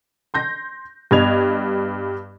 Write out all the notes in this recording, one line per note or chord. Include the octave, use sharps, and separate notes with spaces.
C6 G6 A#6
G2 B3 D#5 G#6 F7